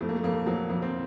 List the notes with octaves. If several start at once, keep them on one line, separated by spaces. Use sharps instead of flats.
F2 A3
A#3
A3
F2 A#3
A3
F2 F#3 A#3
F2 A#3
C4